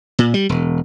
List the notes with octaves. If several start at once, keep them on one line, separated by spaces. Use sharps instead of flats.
A#2
G3
E1